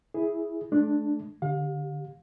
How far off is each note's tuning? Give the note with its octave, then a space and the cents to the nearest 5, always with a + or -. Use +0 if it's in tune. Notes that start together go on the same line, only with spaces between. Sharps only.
E4 +0 G#4 +0
A3 -40 D4 +0
D3 +0 G4 +0 F5 +35